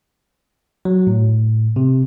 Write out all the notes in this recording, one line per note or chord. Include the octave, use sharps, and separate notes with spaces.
F#3
A2
C3